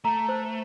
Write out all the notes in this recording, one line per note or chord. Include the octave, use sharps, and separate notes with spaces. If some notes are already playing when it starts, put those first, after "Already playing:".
A3 A#5
C5